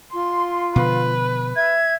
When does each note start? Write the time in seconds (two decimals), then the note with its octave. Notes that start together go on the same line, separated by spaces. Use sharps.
0.13 F4 C6
0.76 B2 D3 F3 B4
1.56 E5 G#6